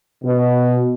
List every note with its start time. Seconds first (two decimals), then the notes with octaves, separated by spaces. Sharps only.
0.24 B2